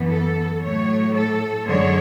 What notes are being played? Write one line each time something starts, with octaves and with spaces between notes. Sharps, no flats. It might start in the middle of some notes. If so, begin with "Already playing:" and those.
Already playing: F#2 E3 B3
A4
A2 F#3 A3 C#5
A4
F#2 D3 G#3 C#5